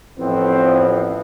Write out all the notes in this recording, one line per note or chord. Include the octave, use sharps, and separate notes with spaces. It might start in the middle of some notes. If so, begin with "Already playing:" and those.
A1 A2 F3 B3 C4